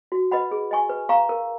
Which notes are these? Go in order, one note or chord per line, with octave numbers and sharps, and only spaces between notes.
F#4
B4 D#5 F#5 B5
G#4
D#5 G#5 C#6
B4
F5 A#5 C#6
A#4